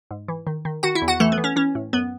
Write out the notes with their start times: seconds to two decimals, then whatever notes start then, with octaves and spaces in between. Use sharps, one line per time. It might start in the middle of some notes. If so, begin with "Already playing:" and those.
0.11 G#2
0.28 E3
0.47 D#3
0.65 D#3
0.83 D#3 F#4 F#5
0.95 E4 E5
1.02 E2
1.08 F#4 F#5
1.20 E3 A3 A4
1.32 B3
1.38 E3
1.44 C#4
1.56 E3 C#4
1.75 A2
1.93 F#2 B3